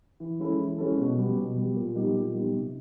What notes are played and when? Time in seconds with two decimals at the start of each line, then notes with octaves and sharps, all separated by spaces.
0.20 E3
0.40 G#3 C#4 E4 A4
0.59 E3
0.78 G#3 C#4 E4 A4
0.97 B2
1.18 G3 B3
1.37 B2
1.56 G3 B3
1.75 A#2
1.95 G3 B3 D#4 G4
2.14 A#2
2.34 G3 B3 D#4 G4
2.53 C3